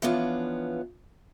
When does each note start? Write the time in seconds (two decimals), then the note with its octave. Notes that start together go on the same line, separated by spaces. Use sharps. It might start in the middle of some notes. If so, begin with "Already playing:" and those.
0.02 E3 F3 B3 C#4 D4 F4